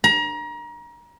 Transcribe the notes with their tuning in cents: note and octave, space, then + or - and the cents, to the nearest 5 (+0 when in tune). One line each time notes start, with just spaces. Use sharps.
A#5 +30